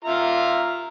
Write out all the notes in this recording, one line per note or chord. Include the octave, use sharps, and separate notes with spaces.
F4 E5 A#5